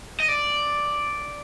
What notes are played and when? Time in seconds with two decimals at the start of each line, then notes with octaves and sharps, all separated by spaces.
0.20 D#5
0.28 D5